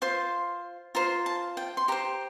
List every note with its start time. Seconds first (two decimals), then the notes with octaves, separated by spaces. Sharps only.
0.02 F4 C5 C6
0.95 F4 C5 A#5
1.26 A5
1.57 G5
1.77 C6
1.88 G4 C5 A#5